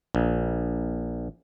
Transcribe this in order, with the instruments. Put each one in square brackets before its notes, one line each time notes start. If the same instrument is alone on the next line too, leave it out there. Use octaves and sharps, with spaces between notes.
[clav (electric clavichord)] A#1